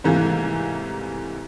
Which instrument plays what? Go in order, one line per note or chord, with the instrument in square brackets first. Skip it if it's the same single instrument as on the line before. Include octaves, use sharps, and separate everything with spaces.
[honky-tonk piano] G#2 C3 E3 G3 A3 A#3